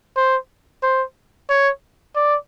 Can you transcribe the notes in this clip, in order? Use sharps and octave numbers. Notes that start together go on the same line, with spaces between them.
C5
C5
C#5
D5